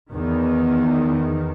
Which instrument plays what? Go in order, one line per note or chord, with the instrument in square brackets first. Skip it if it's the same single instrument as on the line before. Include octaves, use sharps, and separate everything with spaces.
[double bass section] E2 D#3